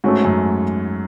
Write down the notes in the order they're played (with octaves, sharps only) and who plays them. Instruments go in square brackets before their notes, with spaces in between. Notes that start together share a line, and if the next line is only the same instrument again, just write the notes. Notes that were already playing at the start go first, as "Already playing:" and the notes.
[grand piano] G#2 [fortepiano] A3 C#4 F#4
[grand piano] F#2